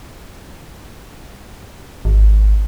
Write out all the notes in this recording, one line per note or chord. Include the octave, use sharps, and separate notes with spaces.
G#1